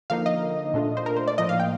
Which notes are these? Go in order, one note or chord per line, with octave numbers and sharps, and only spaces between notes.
D3 F3 A#3 D#4 F5
D#5
A#2 A3 D4 F4
C5
A#4
C5
D5
A2 F3 A#3 D#4 D#5
F5
G5